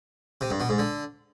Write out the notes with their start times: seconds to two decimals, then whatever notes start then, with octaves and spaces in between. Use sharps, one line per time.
0.41 C3
0.50 G2
0.60 B2
0.69 G#2
0.78 D3